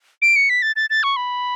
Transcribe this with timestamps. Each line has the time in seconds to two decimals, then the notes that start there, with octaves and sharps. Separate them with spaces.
0.22 D7
0.36 C#7
0.50 B6
0.62 A6
0.76 A6
0.90 A6
1.03 C#6
1.16 B5